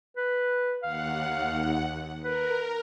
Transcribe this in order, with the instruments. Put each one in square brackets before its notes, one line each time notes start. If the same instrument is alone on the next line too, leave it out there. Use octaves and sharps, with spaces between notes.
[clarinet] B4
[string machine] D#2 F#5 [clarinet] F5
[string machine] A#4 [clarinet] B4